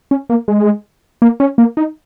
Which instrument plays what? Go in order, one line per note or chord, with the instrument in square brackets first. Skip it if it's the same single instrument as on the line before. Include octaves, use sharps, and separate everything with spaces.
[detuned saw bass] C#4
A#3
G#3
A#3
C#4
A#3
D#4